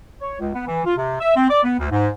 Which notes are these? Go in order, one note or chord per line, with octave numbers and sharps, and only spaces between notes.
C#5
C#2
B3
E3
F4
C3
E5
C4
D5
B3
D2
G#2